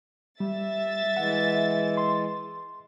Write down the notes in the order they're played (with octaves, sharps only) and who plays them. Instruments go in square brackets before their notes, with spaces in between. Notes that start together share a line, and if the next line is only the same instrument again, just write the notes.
[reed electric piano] G3 [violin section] E5 A6
[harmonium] E3 G#3 [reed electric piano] F#5
[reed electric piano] C6